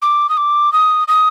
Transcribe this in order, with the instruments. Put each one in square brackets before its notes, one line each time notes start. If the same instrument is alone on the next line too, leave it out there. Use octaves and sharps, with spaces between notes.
[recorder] D6
D#6
D6
D#6
D#6